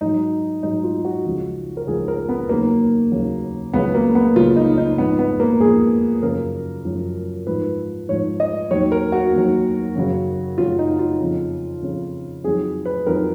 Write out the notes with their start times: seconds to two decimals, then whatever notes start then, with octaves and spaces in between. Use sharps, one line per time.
0.01 G#2 F#3 D#4
0.63 G#2 F#3 D#4
0.84 F4
1.05 F#4
1.25 C#2 C#3 F3
1.77 A#4
1.87 C#2 C#3 F3 G#4
2.08 A#4
2.29 B3
2.49 D#2 C#3 F#3 A#3
3.12 D#2 C#3 F#3
3.73 C#2 C#3 F#3 B3
3.95 A#3
4.15 B3
4.36 C#2 C#3 F#3 F4
4.56 D#4
4.77 D#4
4.98 G#2 F3 B3
5.19 B3
5.40 A#3
5.60 G#2 F3 G#4
6.22 F#2 C#3 F3 A#4
6.85 F#2 C#3 F3
7.47 G#2 F3 B4
8.09 G#2 F3 C#5
8.40 D#5
8.71 D#2 D#3 F#3 C#5
8.92 A#4
9.12 F#4
9.33 D#2 D#3 F#3
9.95 F#2 C#3 F#3
10.58 F#2 C#3 F#3 F4
10.79 D#4
10.99 F4
11.20 F2 C#3 F3
11.82 F2 C#3 F3
12.44 F2 D#3 F#3 G#4
12.85 B4
13.07 F2 D#3 F#3 A#4